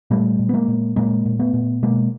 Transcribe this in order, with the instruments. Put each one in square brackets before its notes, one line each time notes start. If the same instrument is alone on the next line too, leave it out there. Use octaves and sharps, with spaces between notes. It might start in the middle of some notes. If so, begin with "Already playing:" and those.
[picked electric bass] A#2 G3 A3
A#2
B3
G#3 A#3
A#2
A#2 G#3 A#3
A#2
A3 B3
A#2
B2 G#3 A#3